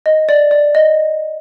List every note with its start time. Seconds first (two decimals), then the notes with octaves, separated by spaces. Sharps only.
0.06 D#5
0.29 D5
0.51 D5
0.75 D#5